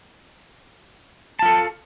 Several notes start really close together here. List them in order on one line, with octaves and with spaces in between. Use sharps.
A5 F4 A4